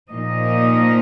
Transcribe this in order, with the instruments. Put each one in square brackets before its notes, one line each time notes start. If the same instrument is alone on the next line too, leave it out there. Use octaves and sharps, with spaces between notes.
[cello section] A#2 F3 A#3 D#4 D#5